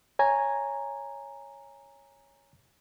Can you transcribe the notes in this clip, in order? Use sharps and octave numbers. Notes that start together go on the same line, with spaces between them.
C#5 G#5 A#5